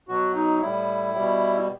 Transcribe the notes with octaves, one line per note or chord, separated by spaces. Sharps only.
B2 F#3 F#4
D#4
A2 G3 E4
B2 G3